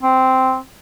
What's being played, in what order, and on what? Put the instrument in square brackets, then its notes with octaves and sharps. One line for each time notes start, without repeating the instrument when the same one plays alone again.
[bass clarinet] C4